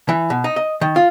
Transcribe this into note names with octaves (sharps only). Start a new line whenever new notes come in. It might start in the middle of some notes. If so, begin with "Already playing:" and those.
E3
B2
D#4
D#5
D#3
F4